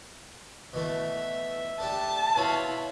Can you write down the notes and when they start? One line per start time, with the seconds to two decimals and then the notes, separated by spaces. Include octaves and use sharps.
0.73 B2 E3 A3 E5
1.80 A3 D4 G4 A5
2.36 B2 E4 F4 C#5 F5